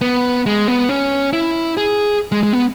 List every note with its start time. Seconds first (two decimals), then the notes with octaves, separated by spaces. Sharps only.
0.01 B3
0.46 G#3
0.68 B3
0.89 C#4
1.33 E4
1.77 G#4
2.32 G#3
2.43 G#3
2.53 B3